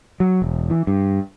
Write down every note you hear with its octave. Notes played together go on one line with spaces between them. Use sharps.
F#3
E1
E3
G2